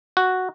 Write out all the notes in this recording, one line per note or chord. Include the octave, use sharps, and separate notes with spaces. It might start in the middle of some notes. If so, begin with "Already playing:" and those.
F#4